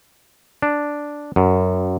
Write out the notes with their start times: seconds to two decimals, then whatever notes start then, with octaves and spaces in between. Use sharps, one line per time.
0.62 D4
1.36 F#2